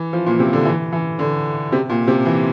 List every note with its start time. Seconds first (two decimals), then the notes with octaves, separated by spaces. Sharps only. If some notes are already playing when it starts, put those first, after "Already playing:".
Already playing: E3
0.13 F3
0.26 A#2
0.39 C3
0.53 D3
0.65 E3
0.93 E3
1.19 D3
1.72 C3
1.89 A#2
2.08 C3
2.26 E3